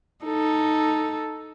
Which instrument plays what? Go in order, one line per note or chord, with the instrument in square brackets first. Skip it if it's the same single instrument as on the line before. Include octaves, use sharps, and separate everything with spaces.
[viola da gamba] D#4 A4